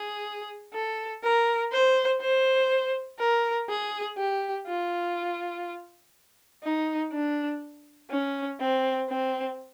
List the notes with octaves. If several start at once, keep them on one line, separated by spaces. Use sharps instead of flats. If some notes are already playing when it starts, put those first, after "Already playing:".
Already playing: G#4
A4
A#4
C5
C5
A#4
G#4
G4
F4
D#4
D4
C#4
C4
C4